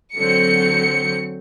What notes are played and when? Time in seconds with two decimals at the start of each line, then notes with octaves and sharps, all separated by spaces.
0.16 D3 F#3 C4 C#7